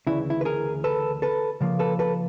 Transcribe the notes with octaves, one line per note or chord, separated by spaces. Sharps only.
D2 C#3 E3 E4
E4
B4
G#4 A#4
A4 B4
A4 B4
C#3 F3 A#3
A4 B4
A4 B4